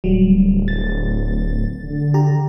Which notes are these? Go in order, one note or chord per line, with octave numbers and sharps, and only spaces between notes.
D1 F#3 G3
A6
D3
G4 A#5